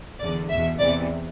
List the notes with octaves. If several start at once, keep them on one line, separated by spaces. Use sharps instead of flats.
E2 D3 D5
E2 B2 E5
E2 C3 E3 D5